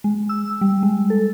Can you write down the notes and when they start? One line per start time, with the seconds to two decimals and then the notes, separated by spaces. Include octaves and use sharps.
0.04 G#3
0.29 E6
0.61 G3
0.83 G#3
1.10 A4